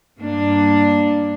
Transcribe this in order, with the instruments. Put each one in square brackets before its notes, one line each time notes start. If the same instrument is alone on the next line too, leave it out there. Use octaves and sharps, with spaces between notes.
[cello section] G2 A#3 D4